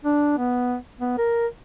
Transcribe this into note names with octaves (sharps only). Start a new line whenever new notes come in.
D4
B3
B3
A#4